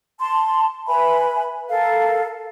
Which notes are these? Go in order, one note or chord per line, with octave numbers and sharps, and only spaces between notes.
A5 C6
B4 E5 G#5 B5
A4 A#4 F5